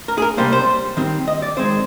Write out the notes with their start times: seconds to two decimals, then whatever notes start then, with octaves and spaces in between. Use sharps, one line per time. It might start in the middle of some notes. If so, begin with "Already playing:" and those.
0.08 A#4
0.18 G#4
0.22 A#4
0.37 C3 G3 A#3 C5
0.53 C5
0.97 D#3 G3 C4
1.28 D#5
1.42 D5
1.57 D#3 G#3 C4 C5